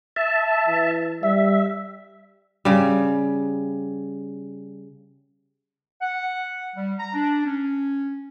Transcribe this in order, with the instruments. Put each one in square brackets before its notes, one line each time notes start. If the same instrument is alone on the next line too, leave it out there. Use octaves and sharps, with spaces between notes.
[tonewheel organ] E5 A5
[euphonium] E3
[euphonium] G3 [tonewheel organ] E5
[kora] C#3 G3
[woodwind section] F#5
G3
A#5
D4
C#4